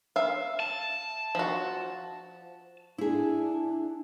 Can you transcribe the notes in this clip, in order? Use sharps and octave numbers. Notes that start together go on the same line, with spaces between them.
E5 F5
A5
F3 F#4
D4 E4 G#4